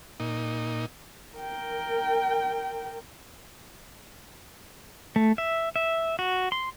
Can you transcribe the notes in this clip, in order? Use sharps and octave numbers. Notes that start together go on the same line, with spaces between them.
A#2 D#4
A#4 G5
A3
E5
E5
F#4
C6